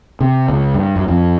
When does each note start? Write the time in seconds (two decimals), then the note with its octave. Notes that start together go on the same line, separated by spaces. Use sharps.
0.21 C3
0.49 C#2
0.74 G2
0.96 F#2
1.08 F2